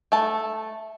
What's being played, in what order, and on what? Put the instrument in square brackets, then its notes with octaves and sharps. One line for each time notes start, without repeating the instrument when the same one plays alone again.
[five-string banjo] A3 A5